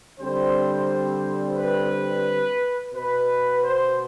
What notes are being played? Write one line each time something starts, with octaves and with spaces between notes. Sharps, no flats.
D3 G3 C4 C5
B4
B2 B3 B4
C5